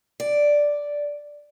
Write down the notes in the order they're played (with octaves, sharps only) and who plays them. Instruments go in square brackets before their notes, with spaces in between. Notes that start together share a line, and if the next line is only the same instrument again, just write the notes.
[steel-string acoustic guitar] D5